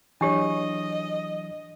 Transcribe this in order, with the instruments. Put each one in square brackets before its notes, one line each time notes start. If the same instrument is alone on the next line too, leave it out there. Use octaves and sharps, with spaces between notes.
[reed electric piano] E3 F#3 [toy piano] D4 G4 C#5 [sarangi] D#5